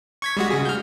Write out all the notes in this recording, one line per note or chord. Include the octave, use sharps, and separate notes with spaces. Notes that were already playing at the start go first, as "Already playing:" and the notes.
C#6 G#6 B6
G3 G#3 F#4
C#3 G#4
F6 G6